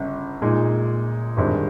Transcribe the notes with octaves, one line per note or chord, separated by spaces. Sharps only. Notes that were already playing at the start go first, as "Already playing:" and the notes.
Already playing: G1 C#3
A#2 G#3 D#4
G1 G2 D#3 G#3 C4